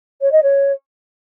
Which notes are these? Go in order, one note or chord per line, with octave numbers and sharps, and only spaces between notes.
C#5
D#5
C#5